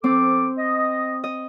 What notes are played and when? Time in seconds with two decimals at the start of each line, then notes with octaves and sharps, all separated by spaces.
0.04 F3 C4 A4 D6
0.58 D#5
1.24 D#5